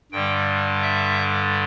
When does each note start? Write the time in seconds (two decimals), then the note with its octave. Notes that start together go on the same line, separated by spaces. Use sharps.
0.12 G2 D3 G3 G5
0.82 E5